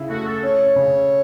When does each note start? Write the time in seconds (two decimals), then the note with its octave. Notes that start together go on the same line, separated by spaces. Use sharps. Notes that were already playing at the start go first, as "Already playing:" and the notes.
Already playing: C#3 E4
0.10 A3 F#4
0.26 A4
0.43 C#4 C#5
0.76 C#3